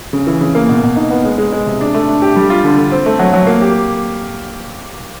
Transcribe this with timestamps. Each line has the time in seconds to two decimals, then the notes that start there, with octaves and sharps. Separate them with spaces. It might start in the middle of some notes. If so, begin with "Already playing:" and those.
0.13 C#3
0.27 E3
0.41 C#3
0.55 A#3
0.69 B2
0.83 B2
0.96 D#4
1.11 B3
1.24 G#3
1.38 G#3
1.53 G#3
1.66 C3
1.81 D4
1.95 A3
2.08 D4
2.22 G4
2.36 G3
2.50 F4
2.64 D3
2.78 D3
2.92 C4
3.06 A3
3.19 F#3
3.33 F#3
3.47 A#3
3.61 G4